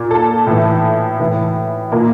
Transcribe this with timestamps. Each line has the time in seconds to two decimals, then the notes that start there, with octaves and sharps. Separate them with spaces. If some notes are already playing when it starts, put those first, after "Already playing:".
Already playing: A#2
0.11 A4
0.46 A2 E3
1.19 A2 E3
1.92 A#2 A#3